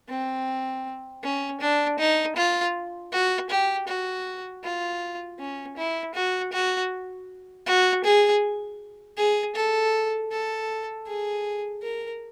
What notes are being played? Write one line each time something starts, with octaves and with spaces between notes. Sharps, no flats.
C4
C#4
D4
D#4
F4
F#4
G4
F#4
F4
C#4
E4
F#4
F#4
F#4
G#4
G#4
A4
A4
G#4
A#4